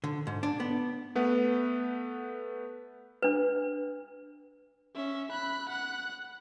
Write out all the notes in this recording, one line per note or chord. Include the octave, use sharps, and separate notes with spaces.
D3
G#2
D4
B3
A3 B3 B4 F#5
D4 B4
C#4 E5
B5 F#6
F#5 F#6